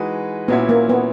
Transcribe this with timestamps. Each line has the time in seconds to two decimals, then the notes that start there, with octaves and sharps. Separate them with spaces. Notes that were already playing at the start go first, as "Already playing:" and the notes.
Already playing: E3 G#3 D#4 F#4 B4
0.48 A#2 F#3 B3 C#4 E4
0.69 A#3
0.89 B3